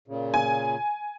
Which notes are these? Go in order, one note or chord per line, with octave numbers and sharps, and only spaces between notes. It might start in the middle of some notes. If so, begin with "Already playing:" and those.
A#2 C#3
G#5